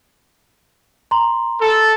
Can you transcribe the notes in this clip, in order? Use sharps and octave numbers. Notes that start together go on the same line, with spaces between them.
A#5 C6
A4